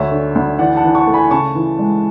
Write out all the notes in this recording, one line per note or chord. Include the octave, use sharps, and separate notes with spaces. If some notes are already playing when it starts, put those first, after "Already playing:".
Already playing: D2 C#5 E5
D3
D2
E3 D5 F#5
F#5 A5
E3
A5 C#6
A3
G#5 B5
C#3 A5 C#6
E3
G#3